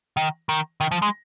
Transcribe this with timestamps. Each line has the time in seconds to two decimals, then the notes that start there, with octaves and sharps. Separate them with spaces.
0.17 D#3
0.49 D#3
0.81 D#3
0.91 F3
1.02 G#3